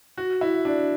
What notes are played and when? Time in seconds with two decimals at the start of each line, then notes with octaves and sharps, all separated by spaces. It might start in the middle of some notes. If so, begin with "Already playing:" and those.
0.17 F#4
0.41 E4
0.65 D4